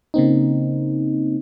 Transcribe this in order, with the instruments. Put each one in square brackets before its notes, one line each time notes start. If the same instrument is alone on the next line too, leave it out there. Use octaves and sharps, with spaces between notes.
[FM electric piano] C#3 A#3 C4 D#4